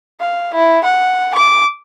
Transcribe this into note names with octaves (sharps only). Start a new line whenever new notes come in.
F5
E4
F#5
D6